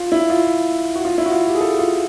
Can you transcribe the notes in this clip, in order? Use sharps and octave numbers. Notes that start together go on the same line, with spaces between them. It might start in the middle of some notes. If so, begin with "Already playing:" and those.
Already playing: F4
E4
F4
F#4
F4
E4
F#4
F4
G4
G#4
A4
F4